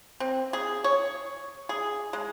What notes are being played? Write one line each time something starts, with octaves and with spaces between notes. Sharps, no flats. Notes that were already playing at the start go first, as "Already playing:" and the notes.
C4
G#4
C#5
G#4
G#3